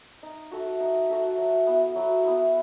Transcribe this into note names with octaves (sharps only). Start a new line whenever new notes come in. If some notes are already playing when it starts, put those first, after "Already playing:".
D#4
F#4 A4 E5
D#4
F#4 A4 E5
F#3
B3 E4
F#3
B3 E4